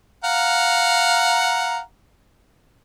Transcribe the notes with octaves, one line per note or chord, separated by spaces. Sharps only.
F5 F#5 A#5